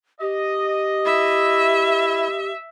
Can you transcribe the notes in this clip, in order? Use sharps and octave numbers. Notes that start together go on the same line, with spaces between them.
G4 D#5
E4 E5